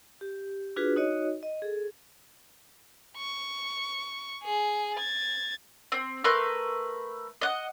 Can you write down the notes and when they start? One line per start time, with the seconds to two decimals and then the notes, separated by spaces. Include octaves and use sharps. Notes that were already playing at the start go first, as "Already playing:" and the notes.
0.21 G4
0.76 D4 F4 F#4 G#4 B4
0.96 D#4 F#4 C#5 D#5
1.43 D#5
1.62 G#4 A4
3.17 C#6
4.43 G#4
4.96 G#6 A6
5.92 C4
6.24 A3 A#4 B4 C6
7.41 D#5 F#5